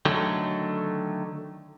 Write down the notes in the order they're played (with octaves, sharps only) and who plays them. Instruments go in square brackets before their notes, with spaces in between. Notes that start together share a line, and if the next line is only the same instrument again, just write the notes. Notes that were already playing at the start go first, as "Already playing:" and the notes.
[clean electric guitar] D3 D#3 F#3 A3